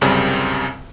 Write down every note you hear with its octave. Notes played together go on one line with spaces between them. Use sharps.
C2 F#2 C#3 G3 C4